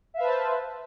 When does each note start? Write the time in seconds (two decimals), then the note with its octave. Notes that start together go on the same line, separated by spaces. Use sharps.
0.14 E5
0.17 F5
0.20 B4
0.23 A5
0.26 C5